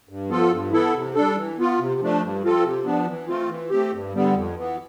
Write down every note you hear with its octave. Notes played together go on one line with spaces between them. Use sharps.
G2
F3 B3 F4 A4
G2
E3 B3 E4 A4
C3
G3 D4 A4
E3
B3 F4
C3
F3 A3 D4
G2
F3 C4 F4 A4
C3
F3 B3 D4
E3
A3 C4 F4
E3
A3 C4 G4
G2
D3 G3 B3
F2
E3 B3